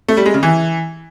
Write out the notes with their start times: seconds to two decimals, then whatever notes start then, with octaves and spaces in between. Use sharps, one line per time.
0.08 A3
0.17 G3
0.26 G#3
0.34 C#3
0.43 E3